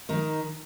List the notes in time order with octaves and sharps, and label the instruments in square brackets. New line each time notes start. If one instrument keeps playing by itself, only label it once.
[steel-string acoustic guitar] D#3 D#4